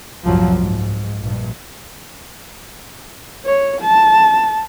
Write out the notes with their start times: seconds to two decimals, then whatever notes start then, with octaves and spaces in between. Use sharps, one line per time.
0.24 C2 F#2 A2 F3 F#3
0.56 G#2
1.20 A#1 G2
3.45 C#5
3.81 A5